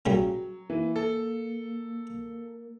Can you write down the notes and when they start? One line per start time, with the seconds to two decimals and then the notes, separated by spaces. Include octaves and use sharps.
0.06 A#2 C#3 F#3 G3
0.70 E3 A#3
0.96 A4